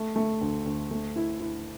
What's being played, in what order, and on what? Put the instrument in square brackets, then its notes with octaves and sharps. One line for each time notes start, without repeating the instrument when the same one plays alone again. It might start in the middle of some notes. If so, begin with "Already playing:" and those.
Already playing: [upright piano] A3
A3
D2
D2
A3
E4
E4